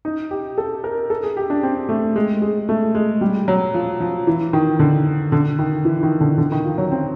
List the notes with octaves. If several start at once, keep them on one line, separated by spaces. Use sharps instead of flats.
D#4
G4
A4
A#4
A4
G#4
G4
D4
C4
A3
G#3
G#3
A3
G#3
G3
F#3
F3
F3
E3
D#3
D3
D3
D#3
E3
D#3
D3
D3
D#3
F3
F#3
C4